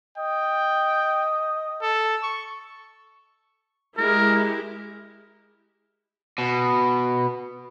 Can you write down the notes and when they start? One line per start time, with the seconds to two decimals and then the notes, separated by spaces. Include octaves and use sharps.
0.18 D#5 G5
1.82 A4
2.23 C#6
3.97 G#3 E4 G4 A#4
6.38 B2